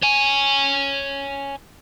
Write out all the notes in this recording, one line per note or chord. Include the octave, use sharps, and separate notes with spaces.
C#5 G#5